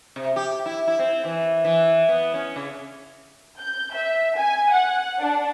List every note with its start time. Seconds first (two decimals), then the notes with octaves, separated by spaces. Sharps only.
0.16 C3
0.36 G4
0.66 E4
0.87 E4
0.99 C4
1.25 E3
1.64 E3
2.09 B3
2.34 C#4
2.56 C#3
3.60 G6
3.93 E5
4.36 G#5
4.73 F#5
5.20 D4